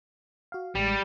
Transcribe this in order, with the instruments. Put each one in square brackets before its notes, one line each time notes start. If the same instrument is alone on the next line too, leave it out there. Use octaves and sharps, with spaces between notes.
[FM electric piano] F#4 F5
[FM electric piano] A1 G#3 [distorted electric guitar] G3